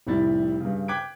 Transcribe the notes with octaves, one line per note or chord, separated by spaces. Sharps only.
F1 C2 A2 G3 E4 A6
G2 C#3
G5 D6 F#6 G#6 B6 D7